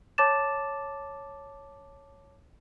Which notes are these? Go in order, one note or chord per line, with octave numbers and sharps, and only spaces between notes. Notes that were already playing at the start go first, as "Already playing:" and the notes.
C#5 A5 D6 A6 E7